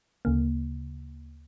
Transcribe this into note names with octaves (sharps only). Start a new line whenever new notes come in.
D2 C#3 A#3